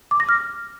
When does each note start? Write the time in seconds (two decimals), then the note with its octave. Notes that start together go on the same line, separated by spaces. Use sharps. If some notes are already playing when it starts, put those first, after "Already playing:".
0.11 D6
0.20 A#6
0.29 F6